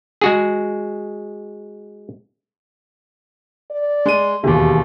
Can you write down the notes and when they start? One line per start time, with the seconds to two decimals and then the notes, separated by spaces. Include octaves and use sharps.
0.21 G#3 F#4 G#4
3.71 D5
4.06 G#3 D#7
4.44 E1 D#2 G4